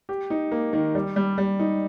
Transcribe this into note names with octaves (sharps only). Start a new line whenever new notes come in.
G4
D#4
A#3
D#3
G3
G3
G3
D#4